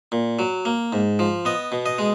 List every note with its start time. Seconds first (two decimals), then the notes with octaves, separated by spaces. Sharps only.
0.12 A#2
0.39 F#3
0.65 A#3
0.93 G#2
1.19 F3
1.45 B3 D#5
1.72 B2
1.86 D#5
1.98 G#3